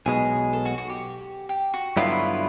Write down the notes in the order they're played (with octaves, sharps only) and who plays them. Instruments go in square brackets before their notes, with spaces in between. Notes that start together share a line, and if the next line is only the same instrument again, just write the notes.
[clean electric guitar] B1 B2 G#3 [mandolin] G#4
[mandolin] A4
F#4
F#4
G4
G4
F#4
[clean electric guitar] G2 D3 F#3 B3 E4 [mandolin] F4